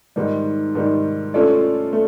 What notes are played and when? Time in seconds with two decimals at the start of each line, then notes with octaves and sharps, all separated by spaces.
0.16 G#2 D#3 G3
0.75 G#2 D#3 G3
1.34 A3 C#4 F4 A4 D5
1.93 A3